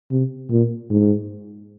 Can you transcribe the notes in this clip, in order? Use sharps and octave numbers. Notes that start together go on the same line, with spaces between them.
C3
A#2
G#2